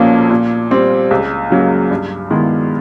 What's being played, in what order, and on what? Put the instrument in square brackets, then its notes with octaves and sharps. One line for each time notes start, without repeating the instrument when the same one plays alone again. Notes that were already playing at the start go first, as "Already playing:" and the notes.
Already playing: [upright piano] B1 A#2 F3 A#3 C#4
A#2
G3 C4
C#2
C#3 F#3 A#3
G2
D#3 G#3 B3 E4